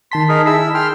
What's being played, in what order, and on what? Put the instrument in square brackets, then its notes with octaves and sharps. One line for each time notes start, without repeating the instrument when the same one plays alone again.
[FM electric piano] D#3 A5 B6 [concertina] C6
[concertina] D#4 G#4 A#4
[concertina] E4 E6 [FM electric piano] G#4 A5 B6
[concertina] G5 C6 F6